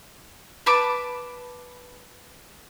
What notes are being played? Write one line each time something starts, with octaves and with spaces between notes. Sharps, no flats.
B4 A5 D6